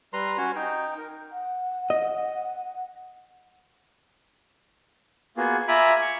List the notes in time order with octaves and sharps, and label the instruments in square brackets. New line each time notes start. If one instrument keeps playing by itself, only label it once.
[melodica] G3 B4 A#5 C6
C#4 F#4 C#5
D#4 G5
A#4
[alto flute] F#5
[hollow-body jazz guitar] D#5
[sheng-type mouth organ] A#3 B3 F4 F#4 G#4
F4 E5 G#5 A#5 B5 D6
C#6